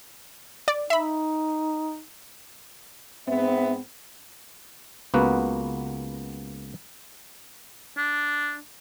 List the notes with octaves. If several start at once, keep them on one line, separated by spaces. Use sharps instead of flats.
D5
D#4 E5 B5
G#2 B3 C4 E5
C#2 A#3 B3 F#4 B4
D4